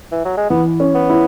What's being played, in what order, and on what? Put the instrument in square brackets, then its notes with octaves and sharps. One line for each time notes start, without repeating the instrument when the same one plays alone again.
[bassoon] E3
F#3
G#3
[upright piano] E3 [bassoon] B3
[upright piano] C#4
[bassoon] B3
[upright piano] E4